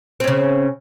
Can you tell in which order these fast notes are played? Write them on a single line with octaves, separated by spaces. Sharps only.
C4 C#4 C#3